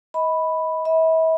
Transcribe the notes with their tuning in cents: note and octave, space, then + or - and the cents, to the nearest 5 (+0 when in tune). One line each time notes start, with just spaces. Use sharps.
D#5 +30 B5 +0
E5 -40 B5 -10